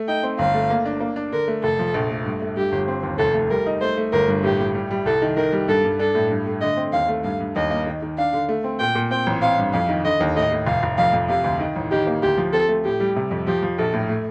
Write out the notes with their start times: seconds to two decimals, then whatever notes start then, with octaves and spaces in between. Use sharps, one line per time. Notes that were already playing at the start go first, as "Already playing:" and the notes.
Already playing: A3
0.08 D#4 G5
0.23 C4
0.39 G1 F5
0.54 A3
0.70 A#3
0.85 D4
1.01 A#3
1.16 D4
1.32 D3 A#4
1.48 A3
1.63 F1 A4
1.79 F3
1.94 A#1
2.10 A3
2.25 G2
2.42 A3
2.56 G2 G4
2.72 G1
2.88 C4
3.03 D#2
3.19 F1 A4
3.34 A3
3.50 G3 A#4
3.67 D#4
3.81 A3 C5
3.98 A3
4.13 G1 A#4
4.28 G2
4.43 A2 G4
4.59 A2
4.75 G3
4.91 G3
5.05 C2 A4
5.22 D#3
5.37 D#3 A#4
5.52 G3
5.68 G2 A4
5.85 G2
5.99 D4 A4
6.15 A2
6.31 G2
6.46 A3
6.61 D3 D#5
6.77 C4
6.93 D#2 F5
7.08 A3
7.24 G2 F5
7.40 G2
7.56 D#2 D#5
7.70 A#3
7.86 D#3
8.02 D#3
8.18 D4 F5
8.33 D3
8.49 A3
8.64 C4
8.79 A#2 G5
8.95 A#2
9.11 C4 G5
9.26 A1
9.42 C4 F5
9.58 G2
9.73 F2 F5
9.89 D#3
10.04 D3 D#5
10.20 D#2
10.36 A2 D#5
10.52 A2
10.67 F1 F5
10.83 F1
10.98 F2 F5
11.13 F2
11.29 C3 F5
11.44 D2
11.60 D#3
11.76 A1
11.91 D#3 G4
12.07 A#3
12.22 D2 G4
12.38 F3
12.53 C4 A4
12.69 A3
12.85 A2 G4
13.00 G3
13.16 C3
13.31 F2
13.47 F3 G4
13.63 F3
13.78 A#1 A4
13.93 A2
14.09 A3